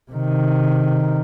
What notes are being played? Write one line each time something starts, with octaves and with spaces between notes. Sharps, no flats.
C3 D#3